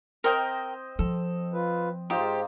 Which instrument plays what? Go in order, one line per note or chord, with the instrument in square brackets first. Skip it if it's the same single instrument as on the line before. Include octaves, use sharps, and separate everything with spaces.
[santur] C4 C5 D#5 [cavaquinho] A#4 G5 A#5
[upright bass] F3 [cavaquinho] A4
[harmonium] F4 B4
[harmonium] G#2 [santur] D#4 F4 C5 [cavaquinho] G4